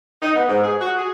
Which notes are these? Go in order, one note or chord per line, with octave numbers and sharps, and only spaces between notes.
D#4
B3
G#2
G#4
F#4
G#4